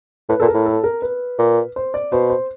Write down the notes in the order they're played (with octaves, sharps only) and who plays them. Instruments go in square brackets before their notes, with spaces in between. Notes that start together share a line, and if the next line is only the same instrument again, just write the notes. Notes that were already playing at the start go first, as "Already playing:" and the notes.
[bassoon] A2 [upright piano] B4
[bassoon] A#2 [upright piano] A4
[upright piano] A#4
[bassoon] A2
[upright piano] A4
A#4
B4
[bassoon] A#2
[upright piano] C5
D5
[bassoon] B2 [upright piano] C5
[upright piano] C5